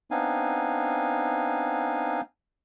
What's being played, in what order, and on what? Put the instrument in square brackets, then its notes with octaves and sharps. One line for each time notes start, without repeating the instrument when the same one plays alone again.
[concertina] B3 C4 D4 D#4 F5 G#5